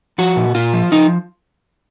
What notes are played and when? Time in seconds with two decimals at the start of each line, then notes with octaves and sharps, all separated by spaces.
0.18 F3 F#4
0.36 A#2
0.55 A#2 F4
0.73 F3
0.92 F3 D#4